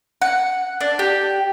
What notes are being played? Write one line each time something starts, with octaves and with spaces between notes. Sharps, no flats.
F#5
D4
G4